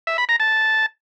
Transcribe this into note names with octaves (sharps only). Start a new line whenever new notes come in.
E5
B5
A#5
A5